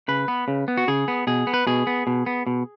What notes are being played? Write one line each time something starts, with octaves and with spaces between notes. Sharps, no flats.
C#3 B4
B3
C#3
B3
F#4
C#3 G#4
B3
B2 G#4
B3
B4
B2 G#4
B3
B2
B3
B2